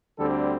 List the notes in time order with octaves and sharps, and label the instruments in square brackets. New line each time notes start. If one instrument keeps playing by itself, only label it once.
[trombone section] D2 D3 G3 C4 A4